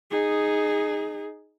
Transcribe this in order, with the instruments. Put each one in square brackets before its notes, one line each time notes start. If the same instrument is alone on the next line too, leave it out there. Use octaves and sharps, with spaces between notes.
[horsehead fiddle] D#4 G#4